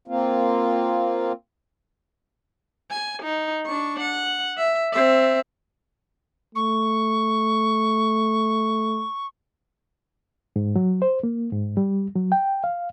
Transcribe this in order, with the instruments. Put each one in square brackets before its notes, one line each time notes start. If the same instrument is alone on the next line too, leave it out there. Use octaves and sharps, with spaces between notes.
[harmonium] A#3 C4 F4
[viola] G#5
D#4
D4 C#6
F#5
E5
C4 E5
[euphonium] A3 [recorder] C#6
[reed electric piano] G#2
F#3
C5
A#3
G#2
G3
F#3
G5
F5